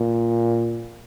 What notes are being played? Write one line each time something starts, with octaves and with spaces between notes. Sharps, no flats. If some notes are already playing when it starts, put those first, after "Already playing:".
Already playing: A#2